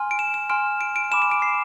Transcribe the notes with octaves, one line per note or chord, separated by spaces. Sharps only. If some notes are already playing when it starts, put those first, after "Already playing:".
Already playing: G#5 C6 F6
D7
E7
E7
G#5 C6 F6 D7
D7
D7
G#5 B5 D6 E7
E7
D7
C7